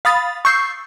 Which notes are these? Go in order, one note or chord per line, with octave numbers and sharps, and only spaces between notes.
F5 B5 D#6 A6
C#6 E6 G6 C7